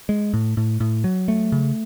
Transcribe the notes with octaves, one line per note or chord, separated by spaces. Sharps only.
G#3
A2
A2
A2
F#3
A3
C#3